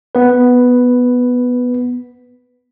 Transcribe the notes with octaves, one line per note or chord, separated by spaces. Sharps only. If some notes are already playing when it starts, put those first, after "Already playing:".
B3 B4